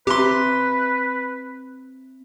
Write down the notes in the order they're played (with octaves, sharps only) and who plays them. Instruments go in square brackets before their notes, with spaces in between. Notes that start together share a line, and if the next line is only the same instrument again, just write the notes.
[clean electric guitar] C4 E5 A#5 [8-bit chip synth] G4 C6 [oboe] B4